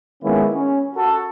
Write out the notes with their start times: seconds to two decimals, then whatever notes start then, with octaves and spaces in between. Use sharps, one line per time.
0.23 D#3 G#3 A#3 B3 C#4 E4
0.53 C#4
0.95 F#4 A4